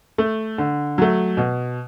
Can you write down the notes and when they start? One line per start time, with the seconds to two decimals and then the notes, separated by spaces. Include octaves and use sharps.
0.18 A3
0.58 D3
0.98 F#3 A3
1.37 B2